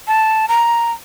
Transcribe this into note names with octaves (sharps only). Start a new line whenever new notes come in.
A5
A#5